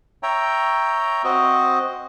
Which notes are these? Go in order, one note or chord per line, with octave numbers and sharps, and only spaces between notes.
C#5 E5 G5 A#5
C4 F#4 D#5